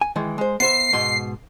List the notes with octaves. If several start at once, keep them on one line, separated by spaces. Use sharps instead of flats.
G#5
D#3 E3 G#3
G#3 C5
B3 C5 E5 C7
G#2 B2 C6